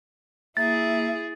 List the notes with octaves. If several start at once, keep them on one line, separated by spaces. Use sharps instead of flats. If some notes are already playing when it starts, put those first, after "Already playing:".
A#3 E4 G#4 E5 A6